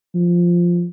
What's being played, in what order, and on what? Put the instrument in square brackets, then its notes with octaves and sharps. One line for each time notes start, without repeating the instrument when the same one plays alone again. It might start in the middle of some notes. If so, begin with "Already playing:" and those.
[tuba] F3